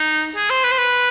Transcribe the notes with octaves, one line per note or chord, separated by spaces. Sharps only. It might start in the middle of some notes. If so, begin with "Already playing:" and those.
Already playing: D#4
G#4
C5
B4
C5
B4